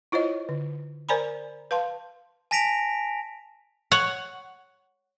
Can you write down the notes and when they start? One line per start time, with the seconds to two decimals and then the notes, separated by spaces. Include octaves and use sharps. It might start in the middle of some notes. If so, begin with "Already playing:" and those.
0.12 E4 F4 C5 C#5 D#5
0.49 D3
1.09 A#4 C5 D5 G#5 A#5 B5
1.71 B4 F5 A5 C6
2.51 G#5 A5 A#6 B6 D7 F7
3.92 C#5 F#5